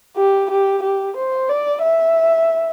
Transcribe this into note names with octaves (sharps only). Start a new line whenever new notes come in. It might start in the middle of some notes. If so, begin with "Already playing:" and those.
G4
G4
G4
C5
D5
E5